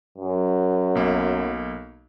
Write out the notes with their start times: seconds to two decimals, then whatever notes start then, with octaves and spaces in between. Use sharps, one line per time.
0.18 F#2
0.95 B1 A#3